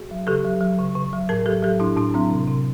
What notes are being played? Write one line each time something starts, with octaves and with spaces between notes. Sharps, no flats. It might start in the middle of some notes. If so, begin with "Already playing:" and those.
Already playing: F#4 G#4
F#3
C#3 G4 A4
F#3
F#3
C#3
C#3
F#3
A2 G#4 A#4
F#3 G4 A4
F#3 G4 A4
A2 D4 E4
A2 D4 E4
F#3 C4 D4
C3
C3